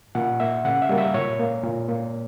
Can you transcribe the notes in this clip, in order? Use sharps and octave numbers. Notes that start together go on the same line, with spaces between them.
A#2 F#5
A#3 E5
C#3 F#5
E5
G3 A#3
E5
A#2 C#5
A#3
A#2
A#3